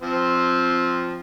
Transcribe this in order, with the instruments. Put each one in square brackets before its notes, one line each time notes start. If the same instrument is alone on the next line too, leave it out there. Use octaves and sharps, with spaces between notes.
[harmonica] F3 C4